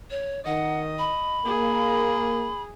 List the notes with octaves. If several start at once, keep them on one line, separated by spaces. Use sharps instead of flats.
C#5
D#3 D#5 F#5
B5
A#3 G#4